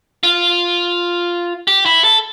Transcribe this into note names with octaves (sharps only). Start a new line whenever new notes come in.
F4
G4
E4
A4